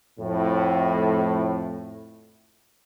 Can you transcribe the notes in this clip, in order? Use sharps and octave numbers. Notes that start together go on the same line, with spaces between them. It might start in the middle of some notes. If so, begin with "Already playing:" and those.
F2 A2